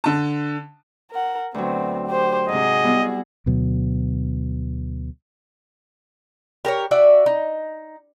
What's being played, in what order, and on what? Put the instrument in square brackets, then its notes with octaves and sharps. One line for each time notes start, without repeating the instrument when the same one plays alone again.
[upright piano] D3 A5
[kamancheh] A#4 F#5
[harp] D2 F#3 [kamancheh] B3 C4
[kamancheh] G4 C5
[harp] G#2 C3 [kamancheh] F#4 G#4 [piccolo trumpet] D#5
[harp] G3 B3 E4
[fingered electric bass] D2 B2 F#3
[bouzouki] G4 A#4 C5 C#5
F#4 D5 E5
D#4